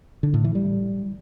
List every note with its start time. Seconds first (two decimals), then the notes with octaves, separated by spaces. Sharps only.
0.23 D3
0.34 A2
0.44 E3
0.55 G3